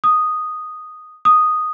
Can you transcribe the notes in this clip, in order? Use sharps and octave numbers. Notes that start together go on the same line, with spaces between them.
D#6
D#6